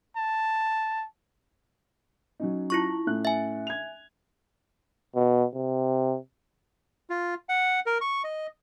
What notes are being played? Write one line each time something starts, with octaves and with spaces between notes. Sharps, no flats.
A5
F#3 C#4 D#4
E4 F4 C#6
A2 C#4 F#6
E5 G#5
G#6 F7
B2
C3
F4
F#5
A#4
C#6
D#5